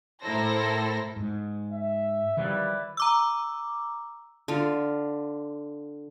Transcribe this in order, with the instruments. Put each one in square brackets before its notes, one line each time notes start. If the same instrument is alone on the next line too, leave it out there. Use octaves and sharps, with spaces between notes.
[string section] A2 E4 A4 A#4 C5 A#6
[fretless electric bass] G#2
[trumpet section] E5
[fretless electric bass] D#3 F3 G3 [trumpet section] E4 B4 D5
[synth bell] A#5 D6 E6
[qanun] D3 F4